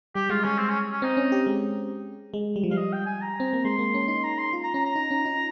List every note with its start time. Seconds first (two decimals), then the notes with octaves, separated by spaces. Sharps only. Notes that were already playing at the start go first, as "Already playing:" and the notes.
0.15 G3 G4
0.30 G#3 F4
0.44 G#3 C#4
0.58 C4
0.69 C#4
0.92 C#4
1.02 C4 D#4
1.17 C#4
1.32 G4
1.47 G#3
2.34 G#3
2.56 G3
2.63 F3
2.71 G3 F5
2.77 D#5
2.92 G5
3.06 G#5
3.22 A#5
3.40 C4
3.53 A#3
3.65 G#3 C6
3.79 A#3
3.94 C#4
4.08 D#4 C6
4.23 A#5
4.38 C6
4.53 F4
4.63 A#5
4.74 C#4 A#5
4.85 A#5
4.96 D#4
5.11 C#4
5.26 D#4